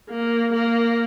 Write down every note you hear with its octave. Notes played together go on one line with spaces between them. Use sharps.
A#3
A#3